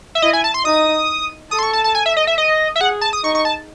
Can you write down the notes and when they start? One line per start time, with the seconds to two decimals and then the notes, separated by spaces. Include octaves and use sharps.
0.15 E5
0.22 E4 D#5
0.33 G#5
0.44 A5
0.54 C6
0.65 D#4 D#6
1.51 A4 D#6
1.59 C6
1.63 C#6
1.73 A5
1.84 A5
1.95 G#5
2.06 E5
2.17 D#5
2.27 E5
2.38 D#5
2.76 E5
2.80 G#4 F#5
3.01 A5
3.13 D#6
3.24 D#4 C#6
3.35 C#6
3.45 A5